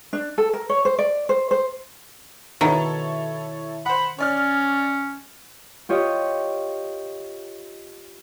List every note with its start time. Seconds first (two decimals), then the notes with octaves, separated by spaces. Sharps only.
0.13 D4
0.38 A4
0.53 A#4
0.69 C#5
0.85 C5
0.99 D5
1.29 C5
1.51 C5
2.61 B2 D#3 E4 A4 C#5
3.86 C5 F#5 B5
4.19 C#4 C#5 D5 F6
5.89 F4 G4 C#5 D#5